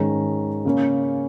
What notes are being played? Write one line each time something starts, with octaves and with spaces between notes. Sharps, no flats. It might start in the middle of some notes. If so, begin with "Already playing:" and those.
Already playing: G#2 D#3 G#3 C#4 A#5
C#3 A#3 C#4